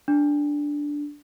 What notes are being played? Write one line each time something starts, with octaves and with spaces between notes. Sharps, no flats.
D4